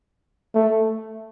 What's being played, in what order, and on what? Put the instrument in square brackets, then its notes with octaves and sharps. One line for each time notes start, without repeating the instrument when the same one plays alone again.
[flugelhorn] A3